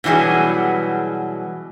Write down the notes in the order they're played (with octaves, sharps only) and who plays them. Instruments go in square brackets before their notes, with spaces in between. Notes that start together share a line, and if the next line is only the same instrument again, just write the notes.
[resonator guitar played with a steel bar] B2 E3 F#3 G3 G#4